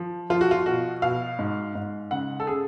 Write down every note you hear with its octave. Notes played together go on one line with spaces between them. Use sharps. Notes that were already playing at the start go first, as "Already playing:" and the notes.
Already playing: F3
F3 F4
F#4
F4
B2 F#4
B2 F5
G#2
G#2
C#3 F#5
A4
C#3 G#4